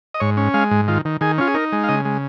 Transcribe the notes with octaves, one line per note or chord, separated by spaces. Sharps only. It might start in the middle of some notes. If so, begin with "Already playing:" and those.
D#5
G#2 C#5
C#4
G#3 F5
G#2
D#3 F4
D#3
D#3 G#4
C#4 F4
G#4
D#4 A#4
G#3
F5
C#3 D#5
G#3